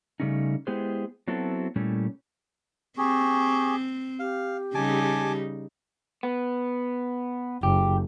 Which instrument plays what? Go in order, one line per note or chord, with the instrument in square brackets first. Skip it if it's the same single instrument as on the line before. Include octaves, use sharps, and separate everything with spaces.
[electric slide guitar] C#3 G3 A3 C#4 D#4
G#3 B3 E4 G4 G#4 C5
F#3 B3 C4 E4 F#4 A4
A#2 G3 A3 C#4 E4
[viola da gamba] C4 [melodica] G4 G#4 [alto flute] C#6
[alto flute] G4 [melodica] F5
[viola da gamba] C#3 G3 D#4 [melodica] G#5 A5 D6
[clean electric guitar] B3
[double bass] F#1 [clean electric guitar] G4